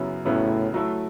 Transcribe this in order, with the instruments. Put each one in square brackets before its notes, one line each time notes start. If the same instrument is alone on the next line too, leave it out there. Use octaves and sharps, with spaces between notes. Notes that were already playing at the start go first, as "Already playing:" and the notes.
Already playing: [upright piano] F#2 C#3 F#3 B3 E4
[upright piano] F#2 C#3 F#3 B3 E4 [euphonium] A2
[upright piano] F#3 A3 E4